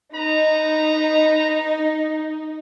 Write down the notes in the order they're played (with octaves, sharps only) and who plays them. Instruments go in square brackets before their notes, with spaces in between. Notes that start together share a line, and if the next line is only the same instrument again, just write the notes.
[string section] D#4 [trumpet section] B4 A#5